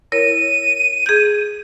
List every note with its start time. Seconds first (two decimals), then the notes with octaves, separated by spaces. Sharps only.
0.12 E4 A#4 C#5 D#7
1.06 G#4 G6